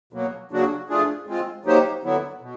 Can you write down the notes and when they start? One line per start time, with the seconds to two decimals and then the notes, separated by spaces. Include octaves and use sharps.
0.13 B2 F#3 A#3
0.51 C#3 F#3 A#3 D4 F#4
0.88 F3 A3 D4 F4 G#4
1.27 G#3 C4 F4
1.65 F#3 A#3 D#4 G4 C5
2.03 D3 F#3 B3 E4
2.41 B2